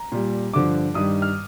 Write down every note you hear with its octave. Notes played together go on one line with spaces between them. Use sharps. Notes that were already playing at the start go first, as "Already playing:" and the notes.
Already playing: A#5
A#2 G3
G2 D3 F3 D6
G2 D#3 G3 D#6
F6